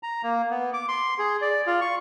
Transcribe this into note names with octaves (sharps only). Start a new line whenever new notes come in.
A#5
A#3
B3
D6
C6
G#4
D5
F4
C#6